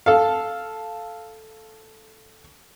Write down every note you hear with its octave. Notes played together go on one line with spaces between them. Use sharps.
A4 F5